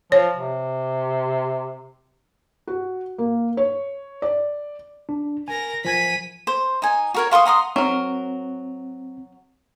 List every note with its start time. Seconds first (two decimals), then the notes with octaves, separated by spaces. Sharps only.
0.12 F3 C#5
0.35 C3
2.67 F#4
3.18 A#3
3.57 C#5
4.22 D5
5.09 D4
5.48 A#4 G#5 A#6
5.85 F3 G#5 G#6 B6 D#7
6.47 C5
6.82 D#4 G#5
7.14 F#4 A#4 C#5
7.31 F5 C6 C#6 D#6
7.45 F#5 A#5 C6 D#6
7.76 F#3 C4 A#4